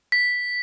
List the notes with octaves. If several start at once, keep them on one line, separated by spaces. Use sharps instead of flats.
B6